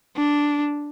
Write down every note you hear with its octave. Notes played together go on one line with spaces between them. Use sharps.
D4